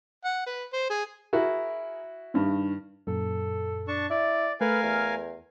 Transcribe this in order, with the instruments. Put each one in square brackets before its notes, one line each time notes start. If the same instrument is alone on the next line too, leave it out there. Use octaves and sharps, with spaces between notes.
[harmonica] F#5
B4
C5
G#4
[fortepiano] E4 F#4 [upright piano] G#4 A#4
[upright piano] G2 D#3
[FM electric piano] F#2 A#2 [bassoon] A4
[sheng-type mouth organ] D4 A5 C#6
[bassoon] E4 [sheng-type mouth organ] D5
[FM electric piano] A3 [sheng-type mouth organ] A#4 F5 G#5 [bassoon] B4
[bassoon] E2